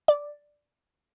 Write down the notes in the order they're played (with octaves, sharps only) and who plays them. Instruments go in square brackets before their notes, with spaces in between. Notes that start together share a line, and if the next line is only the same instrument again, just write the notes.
[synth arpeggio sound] D5